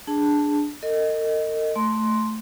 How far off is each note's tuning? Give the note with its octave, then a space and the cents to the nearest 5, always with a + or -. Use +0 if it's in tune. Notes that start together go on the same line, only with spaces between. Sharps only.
D4 +0 G#4 +0 A5 +0
A#4 -45 D#5 +0
A3 +0 C6 +0